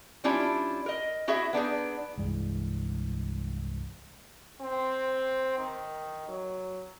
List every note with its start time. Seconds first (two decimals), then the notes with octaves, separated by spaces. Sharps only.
0.24 G3 C#4 D4 E4 F4
0.86 A#4 D#5
1.28 E4 F#4 G#4 E5
1.53 B3 D4 D#4 G#4
2.18 C2 G2 E3 G#3
4.61 C4
5.58 D#3
6.28 F#3